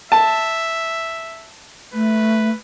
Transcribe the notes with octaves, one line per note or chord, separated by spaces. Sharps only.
E5 A5
A3 B4